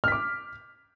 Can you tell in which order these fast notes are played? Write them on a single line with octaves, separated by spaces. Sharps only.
F6 B6 D6